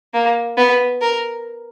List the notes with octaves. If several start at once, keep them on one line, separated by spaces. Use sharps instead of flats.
A#3
B3
A#4